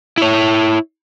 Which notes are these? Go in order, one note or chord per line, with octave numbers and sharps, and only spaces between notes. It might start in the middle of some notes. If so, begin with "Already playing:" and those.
E4 C#5